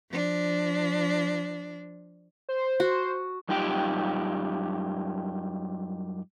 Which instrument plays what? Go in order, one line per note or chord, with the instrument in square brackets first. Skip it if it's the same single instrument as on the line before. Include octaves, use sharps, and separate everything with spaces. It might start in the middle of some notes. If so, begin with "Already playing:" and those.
[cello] F3 D4
[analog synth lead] C5
[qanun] F#4
[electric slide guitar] F#2 G3 D#4 F4 G4 G5